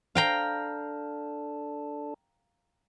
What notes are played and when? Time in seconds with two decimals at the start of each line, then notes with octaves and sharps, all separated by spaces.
0.15 D4 A4 F5 G5 A#5